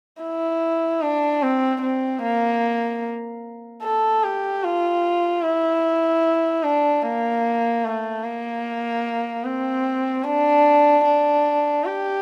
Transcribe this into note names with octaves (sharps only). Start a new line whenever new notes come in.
E4
D4
C4
C4
A#3
A4
G4
F4
E4
D4
A#3
A3
A#3
C4
D4
D4
G4